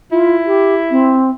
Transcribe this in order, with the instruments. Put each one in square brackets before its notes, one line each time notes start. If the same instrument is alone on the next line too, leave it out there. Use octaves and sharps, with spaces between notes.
[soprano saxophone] E4 [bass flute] F4
[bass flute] G4
C4